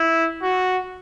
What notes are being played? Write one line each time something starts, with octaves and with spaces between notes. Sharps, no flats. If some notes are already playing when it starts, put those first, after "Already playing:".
Already playing: E4
F#4